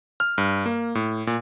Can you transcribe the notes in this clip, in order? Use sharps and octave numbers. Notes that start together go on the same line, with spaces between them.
F6
G2
A#3
A2
A#2